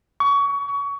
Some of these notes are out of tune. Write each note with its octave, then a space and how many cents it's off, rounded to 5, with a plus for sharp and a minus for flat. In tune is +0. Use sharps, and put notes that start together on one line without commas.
C#6 +25